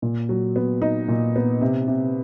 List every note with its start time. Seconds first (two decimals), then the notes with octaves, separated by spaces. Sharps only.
0.02 A#2
0.29 F#3
0.56 B3
0.82 D#4
1.08 A#2
1.36 B3
1.61 C3
1.88 C3